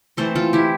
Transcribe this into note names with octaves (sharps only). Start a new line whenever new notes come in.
E3 A3 C4 A4 C5
F4 A4
E4 G4